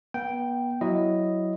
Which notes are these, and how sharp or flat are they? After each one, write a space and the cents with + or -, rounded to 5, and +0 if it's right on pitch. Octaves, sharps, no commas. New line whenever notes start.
B3 -35 G5 -5
F#3 +0 E4 +0 D#5 -5